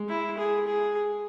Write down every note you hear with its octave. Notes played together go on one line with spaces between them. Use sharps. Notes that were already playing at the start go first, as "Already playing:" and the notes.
Already playing: G#3
E4
G#4
G#4